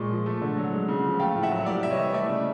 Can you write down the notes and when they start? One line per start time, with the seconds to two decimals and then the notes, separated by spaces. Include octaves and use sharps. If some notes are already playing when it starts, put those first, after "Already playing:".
Already playing: A#2 G#3 C#6
0.09 F3
0.26 A3
0.42 D3
0.57 F#3
0.72 G#3
0.88 C#3
1.04 F3
1.20 A3 F5 G5
1.35 A2
1.43 E5 F#5
1.51 F#3
1.66 G3 D5
1.83 C3 E5
1.90 C#5 D#5
1.98 E3
2.13 A3 D5 E5
2.29 C#3